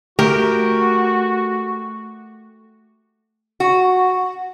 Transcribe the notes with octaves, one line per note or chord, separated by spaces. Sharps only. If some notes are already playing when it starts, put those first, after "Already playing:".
A3 F#4 G4 A#4
F#4